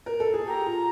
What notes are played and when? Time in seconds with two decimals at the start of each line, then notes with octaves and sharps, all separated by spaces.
0.06 A#4
0.20 A4
0.34 G#4
0.47 G4 A#5
0.66 F4